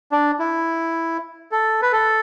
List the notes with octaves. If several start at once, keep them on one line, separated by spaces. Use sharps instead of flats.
D4
E4
A4
B4
A4